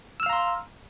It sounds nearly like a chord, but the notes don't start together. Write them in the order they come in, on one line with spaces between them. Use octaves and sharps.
E6 F6 F5 A#5 C6